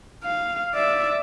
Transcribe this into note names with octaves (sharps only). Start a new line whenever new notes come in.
F5
D5 E5